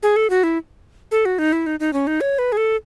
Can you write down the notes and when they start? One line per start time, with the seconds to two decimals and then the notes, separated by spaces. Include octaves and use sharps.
0.03 G#4
0.16 A4
0.30 F#4
0.43 E4
1.11 A4
1.25 F#4
1.39 D#4
1.53 E4
1.66 D#4
1.80 D#4
1.93 C#4
2.07 D#4
2.21 C#5
2.39 B4
2.52 G#4
2.57 A4